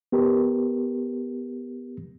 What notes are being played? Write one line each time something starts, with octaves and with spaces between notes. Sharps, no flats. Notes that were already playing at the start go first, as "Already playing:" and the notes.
B3 G4 A#4